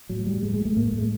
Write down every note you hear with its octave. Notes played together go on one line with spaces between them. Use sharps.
A2 F#3
A2 G3
A2 G#3
G#3
A2
A3
A2 A#3
A3
A2
G#3